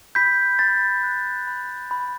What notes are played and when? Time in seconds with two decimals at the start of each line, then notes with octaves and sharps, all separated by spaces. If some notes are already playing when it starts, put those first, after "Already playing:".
0.15 B5 G6 B6
0.59 B5 A6
1.03 F#6
1.47 B5
1.91 B5